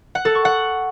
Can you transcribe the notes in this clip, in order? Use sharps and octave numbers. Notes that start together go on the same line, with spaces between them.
F#5
A4
C#6
F#5